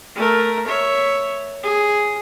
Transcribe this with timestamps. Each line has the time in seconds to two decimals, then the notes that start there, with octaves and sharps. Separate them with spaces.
0.15 A3 A#4
0.67 C#5 E5
1.63 G#4